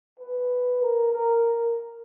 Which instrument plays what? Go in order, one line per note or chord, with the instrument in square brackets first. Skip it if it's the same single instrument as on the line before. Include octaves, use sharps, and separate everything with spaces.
[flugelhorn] B4
A#4
A#4